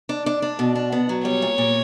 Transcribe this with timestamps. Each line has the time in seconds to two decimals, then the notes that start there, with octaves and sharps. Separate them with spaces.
0.09 D4
0.26 D4
0.42 D4
0.59 B2
0.75 D4
0.92 B3
1.09 F#3
1.25 G3 C#5
1.42 A#2
1.58 A#2